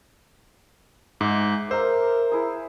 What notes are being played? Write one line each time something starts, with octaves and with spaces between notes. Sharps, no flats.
G#2 G#4 E5 D6
A#4 C5 E5 F5 A#5
E4 G#4